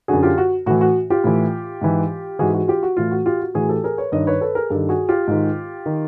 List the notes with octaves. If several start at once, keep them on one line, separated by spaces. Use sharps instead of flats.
F#2 D3 F#4 G#4
F4 G4
F#4
A2 E3 F#4
F#4
F4 G4
A2 E3
G#2 E3
G#2 E3 F#4 G#4
F#4 G#4
F4 G4
F#4
A2 E3 F4
F#4
F4 G4
F#4
A2 E3 F#4 G#4
G4 A4
G#4 A#4
B4 C#5
G2 D#3 C#5 D#5
B4 C#5
A4 B4
G#4 A#4
G2 D#3 G4 A4
F#4 G#4
F4 G4
G#2 D#3
D#3